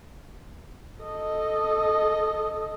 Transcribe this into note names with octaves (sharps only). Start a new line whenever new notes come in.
A4 D#5